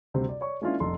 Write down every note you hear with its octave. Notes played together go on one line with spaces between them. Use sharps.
D2 C3 G3 C4
D5
C#5 D5 C#6
G#3 A#3 C#4 D4 E4 F4
F1 A#1 A4 A#5 C6